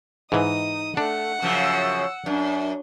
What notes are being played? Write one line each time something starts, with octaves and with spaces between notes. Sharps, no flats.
G#2 E3 D#4 D#6
A3 D4 F#5
F#2 C#3 F3 E6
F#2 D4